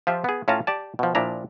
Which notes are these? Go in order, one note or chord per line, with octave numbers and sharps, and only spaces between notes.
F3 F4 G4 E5
B3 G#4
A2 C#4 F4 F5 A5 A#5
G4 D5 A5
B2 F3
A#2 F3 D4 E4 A#5